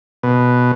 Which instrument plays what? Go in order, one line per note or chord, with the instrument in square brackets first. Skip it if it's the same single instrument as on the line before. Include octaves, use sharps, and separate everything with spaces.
[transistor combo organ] B2